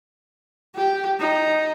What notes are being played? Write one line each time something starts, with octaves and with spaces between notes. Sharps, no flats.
G4
D#4